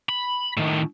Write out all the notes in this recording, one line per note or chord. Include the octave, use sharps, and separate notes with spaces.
B5
A2 D#3